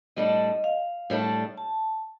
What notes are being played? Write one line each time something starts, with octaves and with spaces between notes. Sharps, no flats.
A2 G3 D4 A4 D#5
F5
A2 G3 D4 A4
A5